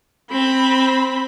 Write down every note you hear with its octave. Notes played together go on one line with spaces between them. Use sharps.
C4 B5